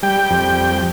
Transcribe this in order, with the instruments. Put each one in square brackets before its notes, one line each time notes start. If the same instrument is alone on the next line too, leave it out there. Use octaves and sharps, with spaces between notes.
[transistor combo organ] G3 G5
F2